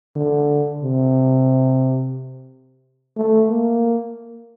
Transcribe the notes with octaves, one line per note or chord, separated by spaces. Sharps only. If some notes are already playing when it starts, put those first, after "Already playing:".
D3
C3
A3
A#3